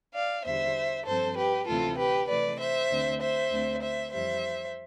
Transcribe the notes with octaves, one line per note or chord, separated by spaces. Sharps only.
D5 F5
E2 D3 G3 C5 E5
G2 F3 C4 A4 C5
G4 B4
D2 C3 E3 A3 C4 F4 A4
G4 B4
C3 E3 A3 B4 D5
C5 E5
D2 D3 A3 C4
C5 E5
D2 D3 A3 C4
C5 E5
F2 E3 G3 C5 E5